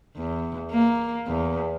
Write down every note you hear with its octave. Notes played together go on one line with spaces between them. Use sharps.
E2
A#3
E2